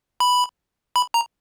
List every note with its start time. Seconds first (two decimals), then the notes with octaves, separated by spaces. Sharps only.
0.20 B5
0.96 B5
1.14 A#5